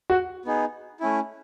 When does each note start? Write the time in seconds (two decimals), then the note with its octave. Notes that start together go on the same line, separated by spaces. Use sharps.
0.10 F#4
0.45 B3 D#4 G#4
1.00 A3 C#4 E4